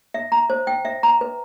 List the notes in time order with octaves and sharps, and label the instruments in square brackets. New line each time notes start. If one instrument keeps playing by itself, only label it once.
[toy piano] E5
A#5
C5
G5
E5
A#5
B4